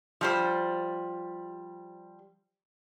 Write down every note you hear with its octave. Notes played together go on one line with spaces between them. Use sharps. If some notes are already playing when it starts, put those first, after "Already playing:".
F3 G3 C5